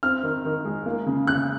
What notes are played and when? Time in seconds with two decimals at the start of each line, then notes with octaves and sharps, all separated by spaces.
0.03 C4 F6
0.23 D#3
0.45 D#3
0.65 G#3
0.86 A#3
1.07 C#3
1.27 C#3 F#6